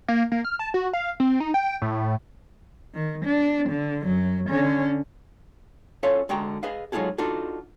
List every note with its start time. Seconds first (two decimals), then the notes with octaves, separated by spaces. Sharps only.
0.08 A#3
0.32 A#3
0.45 F6
0.59 A5
0.74 F#4
0.93 F5
1.20 C4
1.40 D#4
1.54 G5
1.82 A2
2.94 D#3
3.25 D4
3.69 D3
4.05 F#2 F#3
4.49 D3 C#4
6.03 C#4 F4 A4 C#5 E5 F5
6.29 D3 G#3 F#4 G5 A#5
6.63 G#4 B4 D#5 F5
6.92 F#3 G#3 D#4 F4 G#4 A4
7.18 D4 D#4 F4 F#4 A4